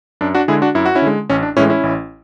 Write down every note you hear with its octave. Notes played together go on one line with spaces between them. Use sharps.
F#2 D4
D4 F#4
D3 G#3 E4 G#4
D4 F#4
F#2 E4
F#4
C#4 E4
D3 G#3
A1 C#4
D4
A2 E3 G#3 C#4 E4
C#4 E4
A1